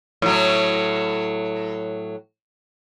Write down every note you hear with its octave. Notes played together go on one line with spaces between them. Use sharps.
A2 F#3